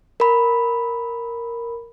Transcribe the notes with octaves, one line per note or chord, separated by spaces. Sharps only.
A#4 B5